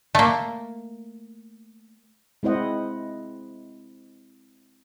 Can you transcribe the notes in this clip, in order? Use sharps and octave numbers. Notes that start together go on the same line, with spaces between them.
A3 A#3
G#3 C4 E4 C5 D#5 F#5